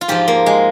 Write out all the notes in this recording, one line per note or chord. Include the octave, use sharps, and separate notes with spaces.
F4
G#2 F3 G4
A#3
G#3